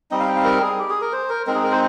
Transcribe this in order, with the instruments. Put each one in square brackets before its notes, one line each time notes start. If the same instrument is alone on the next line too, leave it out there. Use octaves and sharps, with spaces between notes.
[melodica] G3 C4 D#4 D#5
F5
G5
F5
A#4
G#4
G4
G#4
A#4
C5
A#4
G#3 C4 D#4 A#4
G#4
A#4
C5